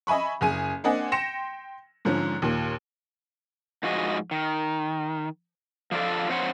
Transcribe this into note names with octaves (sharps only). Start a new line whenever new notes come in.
D#5 E5 G#5 B5 C#6
F#1 G#4 G#5 D#7
A#3 C4 D4 D#5 F#5 G#5
G5 C6 A#6 C#7 E7
G#2 D3 F3 C#4
D#2 A#2
G#2 F3 F#4 G#4 D#5
D#3
F3 D4 F4 A4
F3 C4 C5 C#5 F#5